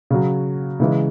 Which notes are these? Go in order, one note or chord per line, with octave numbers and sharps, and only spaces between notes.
C#3 F#3
C#3 E3 G#3